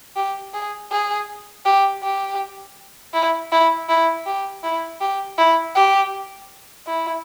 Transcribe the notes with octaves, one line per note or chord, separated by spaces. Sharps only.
G4
G#4
G#4
G4
G4
E4
E4
E4
G4
E4
G4
E4
G4
E4